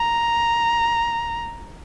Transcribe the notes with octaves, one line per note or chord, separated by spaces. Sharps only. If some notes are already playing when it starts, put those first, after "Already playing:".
Already playing: A#5